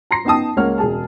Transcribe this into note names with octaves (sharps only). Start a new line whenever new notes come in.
A#5 C6 A#6 C7
B3 D#4 G5 A5 D#6
C#2 G#3 A#3 C#5 F#5 F6
E1 G#4 A5